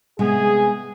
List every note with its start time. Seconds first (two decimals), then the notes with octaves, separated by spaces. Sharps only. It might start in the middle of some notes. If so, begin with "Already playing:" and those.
0.19 C3 G#3 B3 G#4